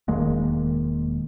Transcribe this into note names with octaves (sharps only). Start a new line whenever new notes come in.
E1 D#3 G#3 A#3